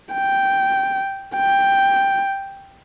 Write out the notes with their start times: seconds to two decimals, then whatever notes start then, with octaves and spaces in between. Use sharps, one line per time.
0.14 G5
1.37 G5